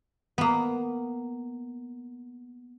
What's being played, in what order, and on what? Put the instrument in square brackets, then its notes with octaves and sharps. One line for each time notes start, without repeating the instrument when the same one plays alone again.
[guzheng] A#3 B3